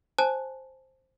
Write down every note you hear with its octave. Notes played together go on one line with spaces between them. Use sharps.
C5 G#5 A5 F#6